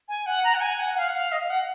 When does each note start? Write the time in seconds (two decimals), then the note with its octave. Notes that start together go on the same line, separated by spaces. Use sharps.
0.08 G#5
0.26 F#5
0.44 A#5
0.54 F#5
0.61 G#5
0.80 F#5
0.90 F#5
0.97 F5
1.08 F#5
1.15 F5
1.32 D#5
1.41 F5
1.50 F#5